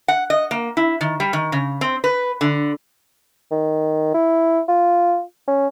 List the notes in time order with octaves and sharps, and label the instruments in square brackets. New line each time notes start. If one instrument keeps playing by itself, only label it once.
[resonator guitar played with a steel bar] F#5
D#5
A#3
E4
D#3
G3
D#3
C#3
C4
B4
D3
[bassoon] D#3
E4
F4
C#4